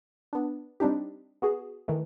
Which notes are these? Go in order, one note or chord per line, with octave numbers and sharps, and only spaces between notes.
B3 D4
G3 C4 D4 D#4 G4
B3 F#4 G#4
D#3 E3 A3